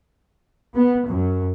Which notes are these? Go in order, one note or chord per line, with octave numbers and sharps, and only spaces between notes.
B3
F#2